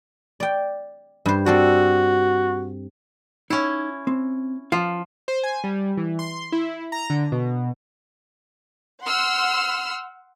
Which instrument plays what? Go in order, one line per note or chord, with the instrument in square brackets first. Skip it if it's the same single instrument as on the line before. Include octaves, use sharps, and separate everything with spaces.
[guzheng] D5 G5
G2 C5
[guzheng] C4 A4 D5 [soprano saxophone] F#4
[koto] C#4 E4 [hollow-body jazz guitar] D#4
[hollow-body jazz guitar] C4
[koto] F3 [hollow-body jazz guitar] F4 F5
[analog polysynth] C5
G#5
G3
E3
C6
E4
A#5
D3
B2
[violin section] F#5 C6 E6 F6